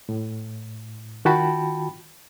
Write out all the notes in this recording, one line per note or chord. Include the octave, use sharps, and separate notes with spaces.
A2
D#3 F4 F#4 G5 A5 B5